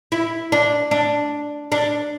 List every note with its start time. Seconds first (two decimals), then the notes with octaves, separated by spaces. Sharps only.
0.12 E4
0.52 D4
0.91 D4
1.72 D4